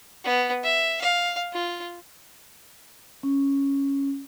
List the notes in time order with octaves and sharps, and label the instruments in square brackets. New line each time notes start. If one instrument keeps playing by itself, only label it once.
[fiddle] B3
E5
F5
F4
[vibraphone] C#4